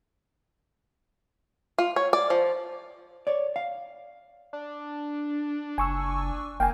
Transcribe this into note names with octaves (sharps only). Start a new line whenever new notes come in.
F4
C#5
D5
F3
C#5 D5
F5
D4
F#1 G#5 C#6 E6
F#1 A#3 G5 G#5